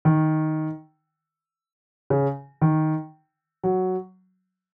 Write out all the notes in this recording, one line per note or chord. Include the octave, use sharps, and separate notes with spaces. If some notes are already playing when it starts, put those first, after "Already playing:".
D#3
C#3
D#3
F#3